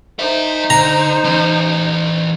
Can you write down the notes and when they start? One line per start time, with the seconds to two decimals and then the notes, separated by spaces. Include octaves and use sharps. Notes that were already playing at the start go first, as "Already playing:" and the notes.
0.19 D#4 A#4 C5 E5
0.70 D3 A#5
1.24 E3 C#4